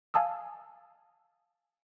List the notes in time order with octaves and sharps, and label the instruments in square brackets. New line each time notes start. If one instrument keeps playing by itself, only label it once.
[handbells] F5 G#5 A5 D#6 E6